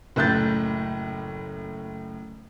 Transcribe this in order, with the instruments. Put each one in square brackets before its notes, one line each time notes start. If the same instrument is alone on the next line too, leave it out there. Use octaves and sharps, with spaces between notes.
[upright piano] F#1 A2 F#6 G6 A6